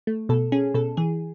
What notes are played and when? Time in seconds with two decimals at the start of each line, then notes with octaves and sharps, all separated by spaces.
0.07 A3
0.29 B2 A4
0.52 C#4 G#4
0.74 B2 A4
0.97 E3 G#4